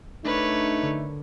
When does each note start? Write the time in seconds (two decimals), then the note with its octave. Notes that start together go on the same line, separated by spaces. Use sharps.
0.25 A3 D4 D#4 A#4 B4 C#5
0.82 D3